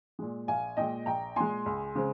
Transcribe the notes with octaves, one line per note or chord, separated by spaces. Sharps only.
A#2 G#3
A#1 F5 G#5
A#2 G#3 D#5 G5
A#1 G5 A#5
A#2 G#3 G#5 C6
C#2
C#3 G#3 C4